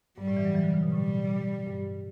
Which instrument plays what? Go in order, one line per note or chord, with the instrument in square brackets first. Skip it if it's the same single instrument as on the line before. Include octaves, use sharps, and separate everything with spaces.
[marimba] G2 [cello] G3
[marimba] A2
E3
F#3
E3
D3
C#3
B2
[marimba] A2 [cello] G3
[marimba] G2